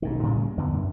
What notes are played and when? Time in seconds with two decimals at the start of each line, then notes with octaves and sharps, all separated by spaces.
0.02 B1 G#2 D#3
0.23 A2 C#3 G3 A#3
0.57 E2 D3 B3
0.73 F#2